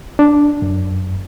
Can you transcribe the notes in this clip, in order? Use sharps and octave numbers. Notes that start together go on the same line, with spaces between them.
D4
F#2